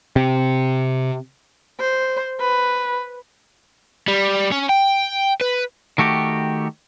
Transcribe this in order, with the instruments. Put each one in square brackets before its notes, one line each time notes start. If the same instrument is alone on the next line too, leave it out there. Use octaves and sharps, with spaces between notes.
[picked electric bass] C3
[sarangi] C5
B4
[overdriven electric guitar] G3
C#4
G5
B4
[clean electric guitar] D#3 A3 F#4 G4